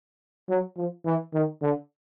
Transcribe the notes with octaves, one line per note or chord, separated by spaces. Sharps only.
F#3
F3
E3
D#3
D3